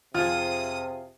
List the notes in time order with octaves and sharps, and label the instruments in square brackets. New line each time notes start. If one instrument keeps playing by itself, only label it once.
[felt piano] F2 F6 [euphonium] C3 [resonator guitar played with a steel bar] F4 G#4 [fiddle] D#6